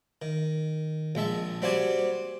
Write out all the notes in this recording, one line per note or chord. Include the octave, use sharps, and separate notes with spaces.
D#3
A#1 G#3 E5 A5
G3 C4 F#4 D5 G#5